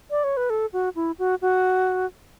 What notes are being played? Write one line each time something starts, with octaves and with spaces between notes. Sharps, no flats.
D5
C#5
B4
A4
F#4
E4
F#4
F#4